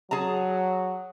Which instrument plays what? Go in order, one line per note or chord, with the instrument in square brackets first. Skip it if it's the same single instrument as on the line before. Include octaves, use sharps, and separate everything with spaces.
[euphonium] F#3 [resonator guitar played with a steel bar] G#4 A5 A#5